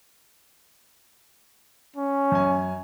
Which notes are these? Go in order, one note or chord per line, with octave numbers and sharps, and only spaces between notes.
C#4
F#2 G#5